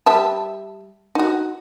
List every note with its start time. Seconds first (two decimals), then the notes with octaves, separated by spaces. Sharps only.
0.06 G3 E5 A5
1.15 D#4 F#4